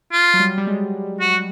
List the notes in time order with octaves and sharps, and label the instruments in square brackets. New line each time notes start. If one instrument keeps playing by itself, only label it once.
[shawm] F4
[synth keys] F#3
G3
G3
G#3
[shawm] F#4